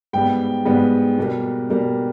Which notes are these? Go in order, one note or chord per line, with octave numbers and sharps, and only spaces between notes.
G#2 G3 B3 G5
G#2 G3 B3
B2 G3 A#3
B2 G3 A#3